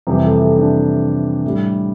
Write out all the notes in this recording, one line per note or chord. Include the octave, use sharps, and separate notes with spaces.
F2 C3 E3 G3 G4
A4
A4
D4
A2 G3